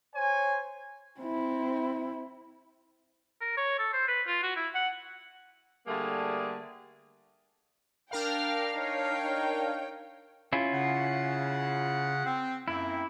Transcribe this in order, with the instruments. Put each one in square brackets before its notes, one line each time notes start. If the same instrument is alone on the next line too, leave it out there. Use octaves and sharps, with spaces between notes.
[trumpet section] C5 C#5 G#5
[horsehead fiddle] C4 E4
[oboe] A#4
C#5
A4
C5
B4
F4
F#4
E4
F#5
[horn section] D3 G3 A3 A#3 G#4
[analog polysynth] D4 A#4 F5 [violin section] G5 F6
[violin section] D#4 C#5 G5
[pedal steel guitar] C#4 E4 F4
[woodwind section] C#3 F#5
C4
[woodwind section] F#2 A#3 C4 [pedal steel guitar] E4